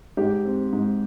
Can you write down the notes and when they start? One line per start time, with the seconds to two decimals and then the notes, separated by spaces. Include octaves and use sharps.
0.17 G#2 G4
0.45 C4
0.73 G#2